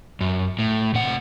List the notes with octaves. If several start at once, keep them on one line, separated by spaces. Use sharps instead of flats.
F#2
A2
C3 F#5